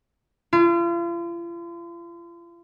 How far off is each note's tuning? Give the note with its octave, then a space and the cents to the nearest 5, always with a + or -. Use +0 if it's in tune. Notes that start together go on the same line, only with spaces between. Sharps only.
F4 -40